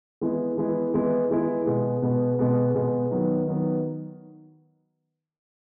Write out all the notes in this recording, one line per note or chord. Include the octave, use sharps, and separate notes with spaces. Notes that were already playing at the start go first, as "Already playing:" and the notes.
E3 G#3 B3 E4
E3 G#3 B3 E4
E3 G#3 B3 E4
E3 G#3 B3 E4
B2 G#3 B3
B2 G#3 B3
B2 G#3 B3
B2 G#3 B3
D#3 F#3 B3
D#3 F#3 B3